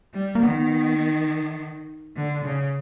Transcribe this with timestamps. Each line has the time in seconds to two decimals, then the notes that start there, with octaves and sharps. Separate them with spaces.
0.14 G3
0.35 A#3
0.42 D#3 B3
2.16 D3
2.44 C#3